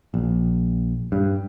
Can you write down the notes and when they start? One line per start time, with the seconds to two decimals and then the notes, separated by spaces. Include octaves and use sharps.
0.14 A#1
1.12 G2